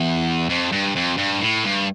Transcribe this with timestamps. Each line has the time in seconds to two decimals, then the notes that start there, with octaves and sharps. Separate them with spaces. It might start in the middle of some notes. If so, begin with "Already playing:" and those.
Already playing: E2
0.49 F2
0.72 G2
0.96 F2
1.18 G2
1.41 A2
1.64 G2